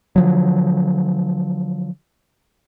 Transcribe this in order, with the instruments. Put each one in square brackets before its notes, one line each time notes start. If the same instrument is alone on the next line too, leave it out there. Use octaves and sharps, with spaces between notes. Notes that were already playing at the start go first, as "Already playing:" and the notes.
[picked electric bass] D3 F3 F#3